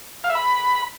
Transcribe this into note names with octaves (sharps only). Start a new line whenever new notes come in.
F5
E5
B5